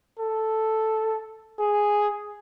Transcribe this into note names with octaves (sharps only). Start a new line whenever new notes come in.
A4
G#4